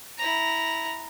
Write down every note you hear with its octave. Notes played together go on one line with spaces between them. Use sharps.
E4 A#5